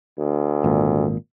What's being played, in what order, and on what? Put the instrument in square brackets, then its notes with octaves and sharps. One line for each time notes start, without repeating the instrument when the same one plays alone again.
[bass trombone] D2
[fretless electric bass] G#1 A#2